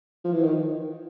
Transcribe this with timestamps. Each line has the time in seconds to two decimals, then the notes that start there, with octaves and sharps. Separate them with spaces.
0.24 F3
0.33 E3
0.43 D#3